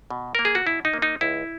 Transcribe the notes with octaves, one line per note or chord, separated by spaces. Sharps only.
B2
A#3 A#4
G#4
F#4
B2 E4
D#4
A#3
D#4
C#2 E4